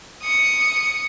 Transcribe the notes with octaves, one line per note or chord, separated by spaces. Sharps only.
D#6 C#7